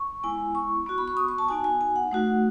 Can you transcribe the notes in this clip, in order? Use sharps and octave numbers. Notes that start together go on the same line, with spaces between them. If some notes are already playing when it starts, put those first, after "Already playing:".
Already playing: C#6
G#3 B3 E4 G#5
C#6
B3 F#4
B5
C#6
D#6
C#6
A5
B3 D#4 F#4 G#5
G#5
G#5
F#5
A3 D#4 F#4